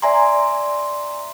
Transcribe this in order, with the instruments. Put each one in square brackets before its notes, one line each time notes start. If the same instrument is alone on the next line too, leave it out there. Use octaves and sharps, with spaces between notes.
[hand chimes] D5 E5 G#5 A#5 C6